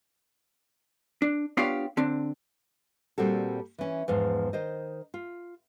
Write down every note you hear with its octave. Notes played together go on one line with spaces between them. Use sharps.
D4
B3 D4 F4 G4 C#5 F5
D3 C4 D4
A#2 G3 C4 F#4 A4
E3 C#4
E2 G#2 F3
D#3 C5 D#5
F4